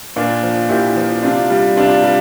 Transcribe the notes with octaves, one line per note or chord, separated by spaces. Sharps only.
A#2 D4 F4
F3
A#2 E4 G4
F3
C3 D4 F4
G3
C3 D4 F4
G3